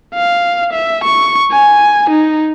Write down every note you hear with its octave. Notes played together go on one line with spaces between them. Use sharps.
F5
E5
C#6
G#5
D#4